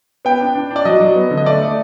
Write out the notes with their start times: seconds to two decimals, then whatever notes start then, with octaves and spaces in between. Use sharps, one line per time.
0.25 B3 G5
0.40 D4
0.55 D4
0.71 D4
0.76 D5
0.85 F#3 D#5
1.00 F#3
1.15 B3
1.31 D3
1.37 D#5
1.46 A3 D5
1.61 A3